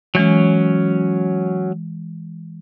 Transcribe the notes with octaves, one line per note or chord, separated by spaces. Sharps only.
E3 F#3 G#3 C#4